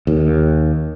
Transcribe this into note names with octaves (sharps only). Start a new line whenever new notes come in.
D#2